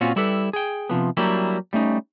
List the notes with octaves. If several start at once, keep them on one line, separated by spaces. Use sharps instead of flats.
A#2 C4 C#4 F4 F#4
G3 E4 G4 A4 B4
G#4 G5
C3 D#3 F3 B3
F#3 G3 A#3 D4 E4 G4
G3 A3 C#4 D#4